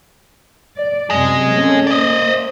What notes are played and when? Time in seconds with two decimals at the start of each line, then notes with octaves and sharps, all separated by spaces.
0.75 D5
1.10 F#2 C3 G#4 D#5
1.53 A#3 C#4 A4
1.87 A#3 C5 D5 D#5